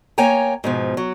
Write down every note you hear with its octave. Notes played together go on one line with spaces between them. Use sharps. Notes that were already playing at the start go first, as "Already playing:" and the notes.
A#3 C#5 G5 G#5 A#5
G#2 B2 F3
F#3